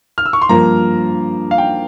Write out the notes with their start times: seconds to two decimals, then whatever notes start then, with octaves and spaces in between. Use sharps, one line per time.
0.18 F6
0.26 E6
0.33 C#6
0.42 C6
0.49 G2 F3 A#3 A#5
1.51 F5
1.58 G5